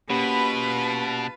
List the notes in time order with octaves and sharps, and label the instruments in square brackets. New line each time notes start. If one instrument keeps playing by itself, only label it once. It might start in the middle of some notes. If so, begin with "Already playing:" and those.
[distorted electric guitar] B2 [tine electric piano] A#3 C#4 G4 [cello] F4 B4 [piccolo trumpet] B5
[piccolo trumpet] A5